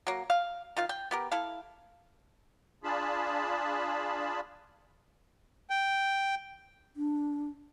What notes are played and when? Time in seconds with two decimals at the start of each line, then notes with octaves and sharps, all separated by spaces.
0.07 F#3 A#3
0.30 F5
0.77 D#3 F4 F5
0.89 G5
1.11 B3 G4 A#4
1.32 E4 A4 F5
2.84 D4 F4 G#4 A5 B5
5.70 G5
6.96 D4